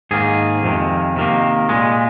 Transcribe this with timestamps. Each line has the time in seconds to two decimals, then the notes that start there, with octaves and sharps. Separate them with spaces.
0.11 G#2 D#3 A#3 G#4
0.63 F2 C3 D#3
1.16 C3 D#3 A#3
1.69 A#2 G#3